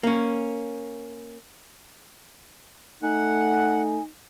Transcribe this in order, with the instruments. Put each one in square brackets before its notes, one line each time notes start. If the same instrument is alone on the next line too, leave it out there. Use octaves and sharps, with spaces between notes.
[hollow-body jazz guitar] A#3 C#4
[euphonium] A3 [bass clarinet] D#4 [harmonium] F#5 [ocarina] G#5